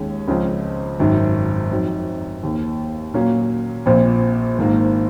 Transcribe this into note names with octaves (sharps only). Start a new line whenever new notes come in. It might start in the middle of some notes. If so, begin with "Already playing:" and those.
Already playing: D#2 D#3 G#3 C#4 G#4
C#2 C#3 F3 C4
G#1 F#2 D#3
F2 D#3 F#3
D#2 D#3 A#3
A#2 F#3 A#3 C#4 F4
A#1 A#2 F3 C4
G#1 G#2 D#3 A#3